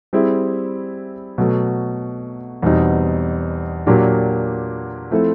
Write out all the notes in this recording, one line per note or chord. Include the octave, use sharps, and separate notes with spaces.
G3 C4 E4 G#4
B2 F#3 A3
E2 B2 G3 C4 D#4
A#2 F#3 A#3 D4 G4
F3 A3 C4 E4 A4